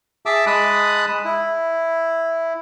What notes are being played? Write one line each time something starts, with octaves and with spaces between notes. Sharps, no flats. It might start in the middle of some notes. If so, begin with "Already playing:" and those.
G#4 E5 A5 D6 E6
G#3 A5 B5 D#6 F#6
E4